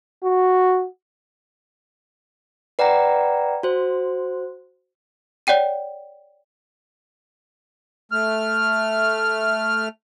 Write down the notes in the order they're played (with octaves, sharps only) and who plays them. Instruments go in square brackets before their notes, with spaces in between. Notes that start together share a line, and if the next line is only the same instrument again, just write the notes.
[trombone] F#4
[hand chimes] B4 D5 F#5 G5 A#5
F#4 C5
[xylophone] C#5 D5 F#5 G5 D#7
[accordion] A3 F6